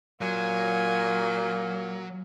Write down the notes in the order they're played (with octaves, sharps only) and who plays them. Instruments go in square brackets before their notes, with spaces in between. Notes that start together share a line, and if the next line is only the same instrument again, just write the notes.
[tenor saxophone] A#2 [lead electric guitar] F#3 [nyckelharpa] F4 G#5